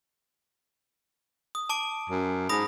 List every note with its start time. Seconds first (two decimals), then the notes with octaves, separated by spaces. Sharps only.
1.55 D#6
1.69 A5 D6 D7
2.10 F#2
2.49 G#2 B5 D#6 A#6